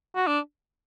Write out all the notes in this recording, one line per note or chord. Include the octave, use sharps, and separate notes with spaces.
F#4
D4